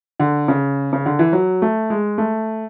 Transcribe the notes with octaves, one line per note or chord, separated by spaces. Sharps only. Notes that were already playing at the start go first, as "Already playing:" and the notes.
D3
C#3
C#3
D3
E3
F#3
A3
G#3
A3